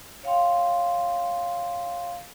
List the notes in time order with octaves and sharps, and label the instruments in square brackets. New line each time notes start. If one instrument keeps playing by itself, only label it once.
[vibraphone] C#5 F5 G5 C6